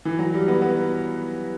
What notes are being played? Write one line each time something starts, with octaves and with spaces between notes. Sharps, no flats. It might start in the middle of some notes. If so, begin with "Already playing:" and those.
E3
F#3
G3
B3
B3